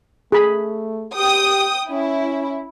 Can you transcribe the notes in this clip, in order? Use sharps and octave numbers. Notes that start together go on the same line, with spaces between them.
A3 G#4 B5
G4 G5 D#6
C#4 E4